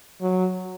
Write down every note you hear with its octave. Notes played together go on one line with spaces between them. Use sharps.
F#3